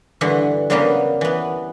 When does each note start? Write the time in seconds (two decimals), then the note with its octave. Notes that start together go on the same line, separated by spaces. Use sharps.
0.21 G2 D3 E3 E5 F#5
0.70 G2 C#3 F#3 G3 A#3 B3
1.21 E3 B3